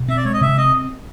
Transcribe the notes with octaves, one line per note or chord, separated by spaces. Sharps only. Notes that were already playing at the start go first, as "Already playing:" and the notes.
Already playing: B2
C4 E5
D5
G#3 C#5
D#5
C3 E5
C4 D#5